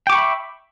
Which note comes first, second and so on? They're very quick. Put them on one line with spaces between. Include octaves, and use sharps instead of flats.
G5 D6 C#6 B5 E5